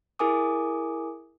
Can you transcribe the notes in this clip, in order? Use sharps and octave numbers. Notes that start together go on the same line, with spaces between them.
E4 G#4 A#4 G#5 D6 D#6